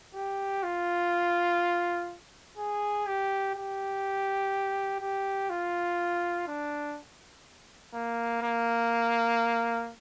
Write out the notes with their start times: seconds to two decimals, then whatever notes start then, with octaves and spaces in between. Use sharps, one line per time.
0.15 G4
0.63 F4
2.58 G#4
3.07 G4
3.55 G4
5.01 G4
5.50 F4
6.47 D4
7.94 A#3
8.42 A#3